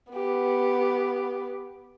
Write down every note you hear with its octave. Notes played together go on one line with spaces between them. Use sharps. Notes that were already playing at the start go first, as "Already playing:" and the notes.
B3 G4